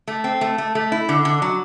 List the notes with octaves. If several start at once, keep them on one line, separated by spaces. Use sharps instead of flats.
A3
C4
A3
A3
A3
E4
D3
D3
F#3